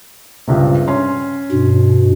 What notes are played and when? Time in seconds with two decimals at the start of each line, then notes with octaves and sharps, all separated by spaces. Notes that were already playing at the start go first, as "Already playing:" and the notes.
0.47 C#2 G2 C3
0.88 C#4 C6
1.52 G2 B2